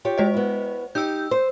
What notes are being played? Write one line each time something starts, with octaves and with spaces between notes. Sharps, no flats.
F4 G4 C#5
G#3 C5 D#5
B3 E4
D#4 G4 E6 G6
C5